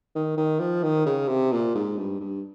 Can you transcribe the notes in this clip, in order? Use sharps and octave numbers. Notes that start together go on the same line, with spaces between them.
D#3
D#3
F3
D#3
C#3
C3
A#2
G#2
G2
G2